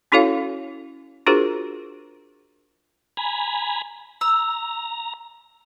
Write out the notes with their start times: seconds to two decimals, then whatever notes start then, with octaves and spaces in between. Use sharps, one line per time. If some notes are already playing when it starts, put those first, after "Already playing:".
0.12 C#4 E4 F#4 A4 C#5 F5
1.26 D4 F4 F#4 G#4 A#4 C5
3.17 G#5 A#5 B5
4.21 A#5 E6